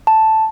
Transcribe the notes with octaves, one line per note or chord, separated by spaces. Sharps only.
A5